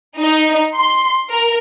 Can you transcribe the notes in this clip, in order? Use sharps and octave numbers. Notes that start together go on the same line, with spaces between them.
D#4
C6
A#4